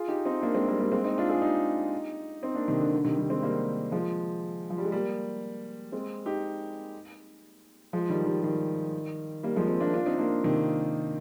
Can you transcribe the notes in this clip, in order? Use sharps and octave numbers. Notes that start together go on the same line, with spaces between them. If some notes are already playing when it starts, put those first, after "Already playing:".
Already playing: F4 G#4
D#4 G4
C4 D#4
A#3 D4
G#3 C4
G3 A#3
G3 A#3
G#3 C4
C4 D#4
D4 F4
F4 G#4
D#4 G4
C4 D#4
A#3 D4
C3 D#3
D3
D3
C3 D#3
D#3 G3
G#3 C4
G3 A#3
F3 G#3
F3
G3
G#3
G3 A#3
G#3 C4
D#4 G4
F3 G#3
D#3 G3
D#3 G3
D#3 G3
G3 A#3
F3 G#3
G#3 C4
A#3 D4
D4 F4
C4 D#4
A#3 D4
C3 D#3